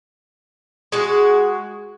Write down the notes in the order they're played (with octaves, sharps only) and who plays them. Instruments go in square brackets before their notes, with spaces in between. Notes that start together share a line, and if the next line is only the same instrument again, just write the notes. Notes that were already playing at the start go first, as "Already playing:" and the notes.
[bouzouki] G#3 F#4